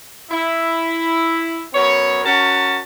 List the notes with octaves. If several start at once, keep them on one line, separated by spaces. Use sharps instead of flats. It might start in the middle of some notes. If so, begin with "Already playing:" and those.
E4
F#2 B3 C#5
C#4 F#4 A#4 A5 A#5